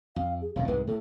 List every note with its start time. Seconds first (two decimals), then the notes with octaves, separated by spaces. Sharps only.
0.16 F2 F5
0.42 G#4
0.56 E1 F2 A2 F5
0.67 C2 G#2 G#3 B4
0.87 A2 A4